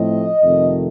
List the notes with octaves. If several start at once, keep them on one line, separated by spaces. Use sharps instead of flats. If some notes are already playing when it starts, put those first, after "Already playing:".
Already playing: A2 F3 A3 C4 D#5
F2 C3 D#3 A3